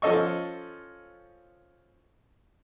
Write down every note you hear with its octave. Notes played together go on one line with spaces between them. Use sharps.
F3 C#4 A4 D#5 C#6